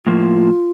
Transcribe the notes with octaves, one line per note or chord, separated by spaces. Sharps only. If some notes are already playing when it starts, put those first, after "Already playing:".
A2 F3 A#3 F4